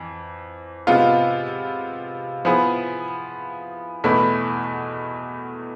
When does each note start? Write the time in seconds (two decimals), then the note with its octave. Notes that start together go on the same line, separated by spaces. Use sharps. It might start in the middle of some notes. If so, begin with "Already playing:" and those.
Already playing: F2 E3
0.87 C3 G#3 B3 F4
2.45 F3 B3 E4 G#4
4.04 E2 B2 A3 E4 B4